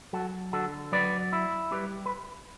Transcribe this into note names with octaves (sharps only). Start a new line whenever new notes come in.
F#3 F#4 A4
D3 F#4 A4
F#3 B4 D5
E4
G3 G4 B4
B4